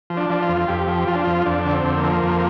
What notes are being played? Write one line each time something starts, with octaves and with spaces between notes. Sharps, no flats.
F3
D4
F3
F4
F2
F2 G4
F3
F3 F4
D4
F2 F4
F2 D4
D3
C4
F2
A#3
F3
F2